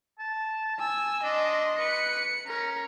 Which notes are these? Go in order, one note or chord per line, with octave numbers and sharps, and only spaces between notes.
A5
G#5 E6
D4 D#5 C6
B4 C#7
C#4 A#4